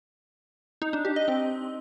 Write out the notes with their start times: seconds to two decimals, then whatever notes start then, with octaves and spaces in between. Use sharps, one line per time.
0.82 D#4
0.93 D4
1.05 G4
1.16 D#5
1.28 C4